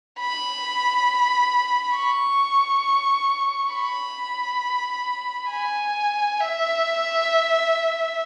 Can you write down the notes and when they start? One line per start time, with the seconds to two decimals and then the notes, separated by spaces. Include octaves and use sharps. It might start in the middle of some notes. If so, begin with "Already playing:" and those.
0.20 B5
1.97 C#6
3.75 B5
5.51 G#5
6.40 E5